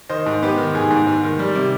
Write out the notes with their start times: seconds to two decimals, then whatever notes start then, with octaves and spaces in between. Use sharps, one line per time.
0.09 D#3 C5 D#5
0.26 G#2
0.42 B3 G4 B4
0.58 D#3
0.75 G#2 G#4
0.90 G#2
1.07 G#2
1.24 D#3
1.39 G3
1.55 C3